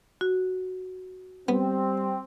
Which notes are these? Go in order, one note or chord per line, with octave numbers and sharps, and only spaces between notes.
F#4
G3 B3 C4